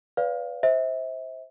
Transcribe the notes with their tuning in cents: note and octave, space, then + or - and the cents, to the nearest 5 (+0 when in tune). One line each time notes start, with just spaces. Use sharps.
B4 +0 D5 -30 F5 +0
C5 +0 E5 -30